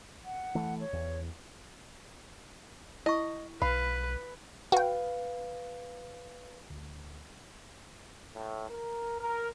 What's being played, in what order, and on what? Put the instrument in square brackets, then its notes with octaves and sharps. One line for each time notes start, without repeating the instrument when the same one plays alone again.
[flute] F#5
[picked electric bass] E3 A3
[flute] C#5
[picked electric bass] E2
[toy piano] E4 C#6 [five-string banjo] D#5
[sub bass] B1 [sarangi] B4 [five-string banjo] F5 [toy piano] B5
[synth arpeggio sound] F#4 G5 [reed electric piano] B4 F5
[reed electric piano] D2
[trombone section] A2
A#4
A#4